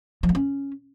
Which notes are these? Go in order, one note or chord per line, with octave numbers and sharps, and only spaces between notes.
F3
A3
C#4